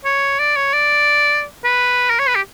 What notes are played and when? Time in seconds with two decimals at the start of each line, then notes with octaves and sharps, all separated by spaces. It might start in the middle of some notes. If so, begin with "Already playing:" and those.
0.05 C#5
0.39 D5
0.56 C#5
0.73 D5
1.64 B4
2.10 A#4
2.19 C#5
2.28 B4
2.35 G4